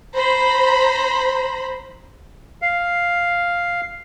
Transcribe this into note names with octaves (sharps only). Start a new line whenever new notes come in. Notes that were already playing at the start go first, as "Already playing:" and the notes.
C5 A#5 B5
F5